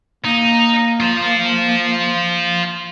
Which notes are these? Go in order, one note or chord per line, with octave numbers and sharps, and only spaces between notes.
A#3 D#4
F4 C5